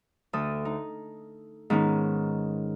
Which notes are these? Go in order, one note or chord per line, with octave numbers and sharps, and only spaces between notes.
D2 A4 D#6
D#4
G#2 D#3 B3 C#4 D#4